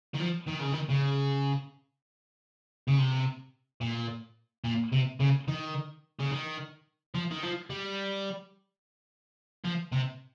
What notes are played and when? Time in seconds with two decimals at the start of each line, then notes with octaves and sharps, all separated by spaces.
0.14 D#3
0.20 F3
0.48 D#3
0.61 C#3
0.74 D#3
0.90 C#3
2.88 C#3
2.98 C3
3.81 A#2
4.64 A#2
4.92 C3
5.20 C#3
5.48 D#3
6.20 C#3
6.31 D#3
7.15 F3
7.31 D#3
7.43 F3
7.70 G3
9.64 F3
9.92 C3